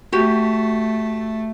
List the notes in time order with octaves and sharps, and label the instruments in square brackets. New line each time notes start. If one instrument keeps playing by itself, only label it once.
[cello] A3 [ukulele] F#4 G4